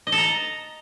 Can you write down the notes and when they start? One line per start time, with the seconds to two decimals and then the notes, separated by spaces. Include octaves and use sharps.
0.07 D#5
0.12 A4
0.18 A#5